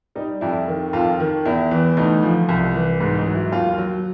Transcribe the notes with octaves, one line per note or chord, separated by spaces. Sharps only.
G3 D#4
F2 E4
D#3
F2 F4
D#3
E2 E4
E3
D2 D#4
F3
C2
E3
G#2
D#4
F#3
E4
D#2 F4
F#3